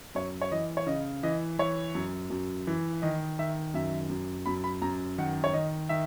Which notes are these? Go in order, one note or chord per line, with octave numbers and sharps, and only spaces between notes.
F#2 C#5
C#5
E3 D#5
C#5
C#3 D#5
E3 D#5
E3 C#5
F#2
F#2
E3
D#3 D#5
D#3 E5
F#2 E5
F#2
F#2 B5
B5
F#2 A#5
D#3 F#5
C#5
D#3 D#5
D#3 E5